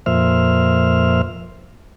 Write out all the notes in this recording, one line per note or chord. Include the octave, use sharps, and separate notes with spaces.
F2 A#2 C5 E5 F6